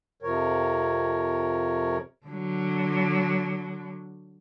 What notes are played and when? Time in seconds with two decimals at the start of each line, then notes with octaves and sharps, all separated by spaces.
0.22 F2 C3 F3 A#4 C#5
2.26 D3 F#3